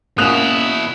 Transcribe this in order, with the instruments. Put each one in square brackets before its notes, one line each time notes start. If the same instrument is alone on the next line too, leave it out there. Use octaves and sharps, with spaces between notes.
[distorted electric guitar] B2 E4 [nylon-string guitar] A#3 C#4 F#4 [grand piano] D#6 F#6 F7